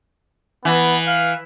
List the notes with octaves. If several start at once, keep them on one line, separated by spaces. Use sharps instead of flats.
E3 B3
F5